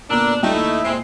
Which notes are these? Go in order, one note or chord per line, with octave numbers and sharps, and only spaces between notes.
A#2 D3 B3 D4 A#4 E6
G3 A3 D#4 F4 G5
D#2 E4 E5
A#2 G#3 C4 G#5 C7